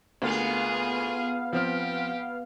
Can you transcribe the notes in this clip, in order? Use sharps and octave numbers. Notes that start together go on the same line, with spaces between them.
D2 A#3 B3 F4 G#4 F5
F3 C4 G4 F6